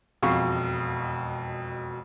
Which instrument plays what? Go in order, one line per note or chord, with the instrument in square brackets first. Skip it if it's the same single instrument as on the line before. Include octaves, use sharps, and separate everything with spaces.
[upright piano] E1 F2 B2 F5 C#6